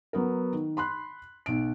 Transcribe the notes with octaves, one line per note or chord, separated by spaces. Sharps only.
F#3 B3 A#4
D#3
B5 C6 F#6
B1 D7